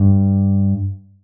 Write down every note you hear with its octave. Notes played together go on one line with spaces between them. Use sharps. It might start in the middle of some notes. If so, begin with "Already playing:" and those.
Already playing: G2